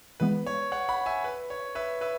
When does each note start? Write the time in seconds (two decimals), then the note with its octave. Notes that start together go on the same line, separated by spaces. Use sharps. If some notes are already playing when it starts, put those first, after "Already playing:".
0.20 E3 G#3 B3 B4
0.47 C#5
0.72 C#5 F#5
0.89 F#5 B5
1.06 E5 G#5
1.24 B4
1.50 C#5
1.75 B4 E5
2.01 B4 E5